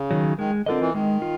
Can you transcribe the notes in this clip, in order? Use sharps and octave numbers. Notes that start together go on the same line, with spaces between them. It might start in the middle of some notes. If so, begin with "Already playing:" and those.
Already playing: C#3
D#3 F#3
D#3 G#3
D3 C4 F4 A#4 D#5
E3
D#3 G#3
F4